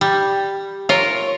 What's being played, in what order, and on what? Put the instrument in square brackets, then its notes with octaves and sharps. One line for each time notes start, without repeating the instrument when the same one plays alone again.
[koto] G3
[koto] F4 A#4 [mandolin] C#5